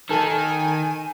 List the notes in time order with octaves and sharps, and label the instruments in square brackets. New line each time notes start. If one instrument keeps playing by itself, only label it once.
[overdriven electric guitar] D#3 [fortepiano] A4 A5 [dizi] G#5